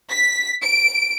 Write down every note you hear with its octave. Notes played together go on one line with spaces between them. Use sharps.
B6
D7